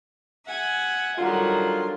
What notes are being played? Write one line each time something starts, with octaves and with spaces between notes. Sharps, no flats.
E5 F#5 G#5
D3 D#3 F#3 G3 F4